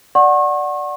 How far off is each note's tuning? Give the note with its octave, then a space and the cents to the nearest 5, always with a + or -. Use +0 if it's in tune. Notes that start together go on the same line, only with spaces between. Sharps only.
D5 +0 F#5 +0 C#6 -40